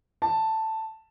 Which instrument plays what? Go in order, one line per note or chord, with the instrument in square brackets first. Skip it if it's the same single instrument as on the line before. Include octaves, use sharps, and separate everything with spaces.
[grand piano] A5